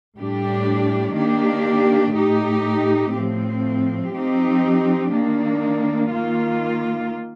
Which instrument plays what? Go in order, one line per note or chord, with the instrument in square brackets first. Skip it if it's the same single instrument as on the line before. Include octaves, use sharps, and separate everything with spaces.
[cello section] A2 G3 D4 G4
D#3 A#3 D4 G4
A2 A3 D#4 G4
A2 F3 C4
F3 C4 D#4 G4
D#3 A#3 D4
D#3 A#3 F4